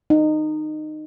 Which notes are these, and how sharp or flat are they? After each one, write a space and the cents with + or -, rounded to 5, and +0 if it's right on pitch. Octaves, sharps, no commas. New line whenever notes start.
D#4 -20